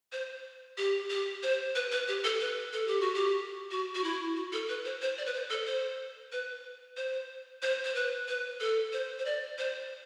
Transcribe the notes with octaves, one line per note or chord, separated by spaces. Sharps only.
C5
G4
G4
C5
B4
B4
G4
A4
B4
A4
G4
F#4
G4
F#4
F#4
E4
F#4
A4
B4
C5
C5
D5
B4
C5
A4
C5
B4
C5
C5
C5
B4
B4
A4
C5
C5
D5
C5